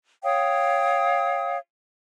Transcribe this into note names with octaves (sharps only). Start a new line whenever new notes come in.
C#5 F5 G5 D#6